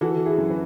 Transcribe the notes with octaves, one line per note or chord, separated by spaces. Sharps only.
E3 F#4 A4
E4 G#4
F#2
B4